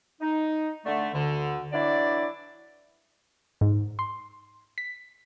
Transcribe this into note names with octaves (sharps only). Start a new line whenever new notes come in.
D#4
D3 A3
D2 D3
E3 F#3 D4 E4 D5
G#2
C6
B6